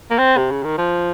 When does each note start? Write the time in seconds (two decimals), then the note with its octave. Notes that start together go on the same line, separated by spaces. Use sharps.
0.11 A#3
0.18 C4
0.37 C3
0.51 C#3
0.64 D#3
0.78 F3